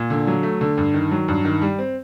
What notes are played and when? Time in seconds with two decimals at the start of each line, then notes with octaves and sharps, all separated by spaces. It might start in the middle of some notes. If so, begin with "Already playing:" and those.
Already playing: A#2
0.10 D3
0.27 F#3
0.43 A3
0.61 D3
0.78 G2
0.94 D#3
1.12 F#3
1.28 G2
1.45 D#3
1.62 G3
1.79 C4